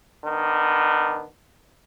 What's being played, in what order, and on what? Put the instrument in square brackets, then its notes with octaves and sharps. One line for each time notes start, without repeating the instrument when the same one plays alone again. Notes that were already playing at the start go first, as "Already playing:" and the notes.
[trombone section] D#3 B3 D4